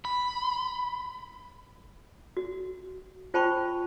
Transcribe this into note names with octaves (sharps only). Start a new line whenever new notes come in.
B5
F#4
F4 C5 G5 A5 B5 C#6